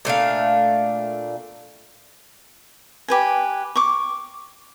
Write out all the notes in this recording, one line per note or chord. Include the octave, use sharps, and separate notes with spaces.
A#2 A3 D4 F5
G4 B4 G#5
C#6 D6